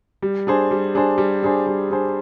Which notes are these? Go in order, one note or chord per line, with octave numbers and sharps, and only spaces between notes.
G3
D4 G#4 C5
G3
D4 G#4 C5
G3
D4 G#4 C5
G3
D4 G#4 C5